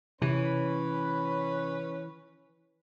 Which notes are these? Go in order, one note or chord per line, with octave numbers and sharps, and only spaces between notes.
C3 E3 C#4 B4